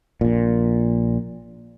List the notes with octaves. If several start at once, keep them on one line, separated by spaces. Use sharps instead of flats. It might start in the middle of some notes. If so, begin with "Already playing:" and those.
A#1 A#2